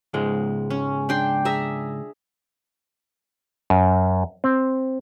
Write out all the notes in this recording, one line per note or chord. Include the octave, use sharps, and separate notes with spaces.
C#2 G#2 G#3
C#4
D4 G5 C6
G#4 E5 A#5
F#2
C4